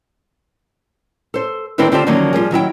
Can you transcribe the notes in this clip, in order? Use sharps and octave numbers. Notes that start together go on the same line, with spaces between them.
A4 C5
D#3 C4 D4 E4 A4 B4
D3 C4 F4 G4 A4 C5
D3 D#3 F3 F#3 A#3 C#4
F3 G3 G#4
D#3 F#3 E4 G5